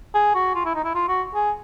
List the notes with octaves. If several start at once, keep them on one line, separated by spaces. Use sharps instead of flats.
G#4
F#4
F4
E4
D#4
E4
F4
F#4
G#4